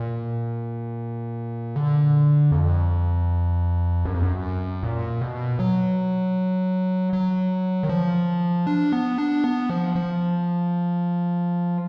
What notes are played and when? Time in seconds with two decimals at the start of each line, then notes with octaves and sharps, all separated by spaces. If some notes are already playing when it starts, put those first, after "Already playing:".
Already playing: A#2
1.76 D3
2.51 F2
4.05 F#2
4.14 F2
4.22 F#2
4.83 A#2
5.21 B2
5.59 F#3
7.13 F#3
7.83 D#3
7.89 F3
8.67 D4
8.92 B3
9.18 D4
9.44 B3
9.70 F3
9.95 F3